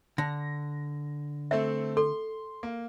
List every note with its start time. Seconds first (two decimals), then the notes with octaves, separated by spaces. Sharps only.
0.18 D3 A#6
1.51 A3 C4 A4 E5
1.97 A4 C6
2.63 A#3